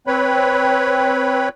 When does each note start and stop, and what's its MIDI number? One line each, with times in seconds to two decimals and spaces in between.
0.07 1.49 60
0.07 1.49 71
0.07 1.49 73
0.07 1.49 83